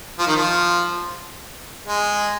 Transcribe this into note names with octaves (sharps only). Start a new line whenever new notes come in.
F3
D#3
F3
G#3